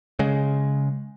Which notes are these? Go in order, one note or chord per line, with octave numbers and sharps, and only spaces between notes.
C#3 G#3